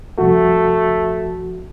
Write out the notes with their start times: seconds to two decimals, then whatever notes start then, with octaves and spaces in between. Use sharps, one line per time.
0.18 C2 F2 A3 F#4